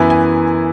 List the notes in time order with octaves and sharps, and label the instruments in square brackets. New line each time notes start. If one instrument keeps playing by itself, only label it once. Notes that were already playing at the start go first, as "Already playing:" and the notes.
Already playing: [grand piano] F#2 E3 B3 E4 G#5
G#5